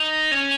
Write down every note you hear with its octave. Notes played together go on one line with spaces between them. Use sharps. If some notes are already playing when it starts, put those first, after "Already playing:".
Already playing: D#4
C#4